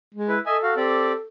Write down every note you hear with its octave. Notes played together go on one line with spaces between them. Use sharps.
G#3
E4 B4
A4 D#5 E5 G#5
F#4 F5
C4 G4 D5